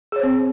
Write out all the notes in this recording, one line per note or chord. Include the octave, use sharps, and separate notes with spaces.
C4 G#4 C5 C#5